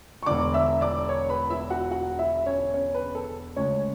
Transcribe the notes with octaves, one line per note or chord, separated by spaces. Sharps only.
C#6
E1 E2 D3 D5 D6
E5 E6
D5 D6
C#5 C#6
B4 B5
E4 E5
F#4 F#5
F#4 F#5
E4 E5
C#4 C#5
C#4 C#5
B4
A4
D2 C#3 G#3 C#4 C#5